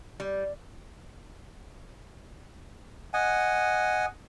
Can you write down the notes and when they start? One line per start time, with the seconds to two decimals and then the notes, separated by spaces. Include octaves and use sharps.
0.20 G3
3.14 D#5 F#5 G#5